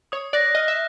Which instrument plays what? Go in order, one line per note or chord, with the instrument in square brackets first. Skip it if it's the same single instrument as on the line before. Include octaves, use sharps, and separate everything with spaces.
[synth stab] C#5 [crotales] D#6
[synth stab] D5 [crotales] F#6 A#6
[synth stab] D#5 [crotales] F6
[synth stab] E5